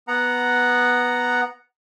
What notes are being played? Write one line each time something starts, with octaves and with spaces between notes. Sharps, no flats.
B3 F#5 A#5